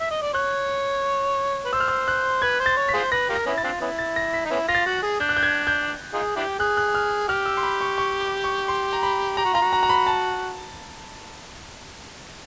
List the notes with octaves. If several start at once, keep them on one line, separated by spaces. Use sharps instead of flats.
E5
D#5
D5
C#5 F#6
B4
C5 E6
F6
E6
F#6
B4 G#6
C5
A6
C#5
B6
F4 G#4 C5
B4 A#6
F4 G4 A#4
A#6
B3 C#4 E4
A6
C4 D4 F4
B3 C#4 E4
A6
A#6
B6
D#4
B3 C#4 E4
F4 A#6
A6
F#4
G#4
D4 G6
F#6
G6
G#6
G6
D#4 F4 G#4
D4 E4 G4
G#4 F#6
F#6
F6
G4 F6
E6
C6
B5
C#6
C#6
D6
C#6
C6
A#5
B5
G4 A#5
F#4
F4 A#5
F#4
A#5
A#5
B5
A5